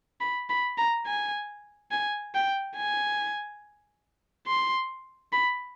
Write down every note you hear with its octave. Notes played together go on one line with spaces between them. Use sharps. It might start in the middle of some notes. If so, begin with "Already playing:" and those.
B5
B5
A#5
G#5
G#5
G5
G#5
C6
B5